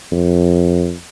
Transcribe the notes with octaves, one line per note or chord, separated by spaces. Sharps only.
F2